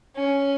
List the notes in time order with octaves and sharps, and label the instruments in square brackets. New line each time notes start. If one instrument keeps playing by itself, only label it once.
[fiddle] C#4